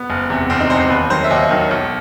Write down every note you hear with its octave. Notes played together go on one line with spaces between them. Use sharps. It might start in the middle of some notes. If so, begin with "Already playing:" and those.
Already playing: B3
F#1
E2 C3
F#1 C4
D#4
E2 C3 C5
C5
D#2 B4
D#3 F#3 C5
E5
D#2 D#5
D#3 F#3
B1